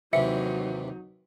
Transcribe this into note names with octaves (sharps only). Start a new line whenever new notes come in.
D#2 C3 E3 F#3 D#4 E5 C#7